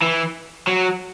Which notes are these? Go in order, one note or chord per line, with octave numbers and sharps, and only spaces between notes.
E3
F#3